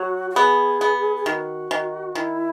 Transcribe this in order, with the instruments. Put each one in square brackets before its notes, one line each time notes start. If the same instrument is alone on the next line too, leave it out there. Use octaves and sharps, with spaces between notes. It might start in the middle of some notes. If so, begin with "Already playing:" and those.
Already playing: [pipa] F#3 [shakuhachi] F#4
[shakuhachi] F#4
[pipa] B3 [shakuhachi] G#4
[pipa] B3
[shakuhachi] G#4
[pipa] D#3 [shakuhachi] F#4
[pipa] D#3
[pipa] D#3 [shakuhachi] E4